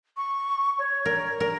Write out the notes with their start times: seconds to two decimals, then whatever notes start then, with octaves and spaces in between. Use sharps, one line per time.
0.16 C#6
0.78 C#5
1.05 A#4
1.40 A#4